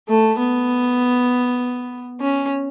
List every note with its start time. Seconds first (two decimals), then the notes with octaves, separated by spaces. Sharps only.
0.09 A3
0.39 B3
2.21 C#4